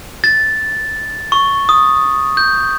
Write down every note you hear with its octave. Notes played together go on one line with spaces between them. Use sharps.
A6
C#6
D#6
G6